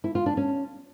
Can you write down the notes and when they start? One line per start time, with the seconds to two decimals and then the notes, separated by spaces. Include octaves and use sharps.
0.04 E4
0.15 F4
0.26 D4
0.37 C#4